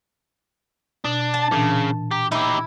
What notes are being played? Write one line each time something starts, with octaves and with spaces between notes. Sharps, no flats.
B2 D4
A5
A#2 C#3 E3 D4
G4 A#5
D#4 E4 G4